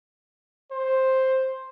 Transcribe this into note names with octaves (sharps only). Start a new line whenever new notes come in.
C5